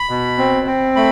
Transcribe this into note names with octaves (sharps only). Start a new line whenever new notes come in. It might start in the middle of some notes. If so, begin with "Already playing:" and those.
Already playing: B5
B2
C4
C4
A3 B5